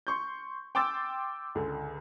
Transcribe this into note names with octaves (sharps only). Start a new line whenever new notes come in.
C6 C#6 G6
G5 C6 D6 E6 A6
C#2 D3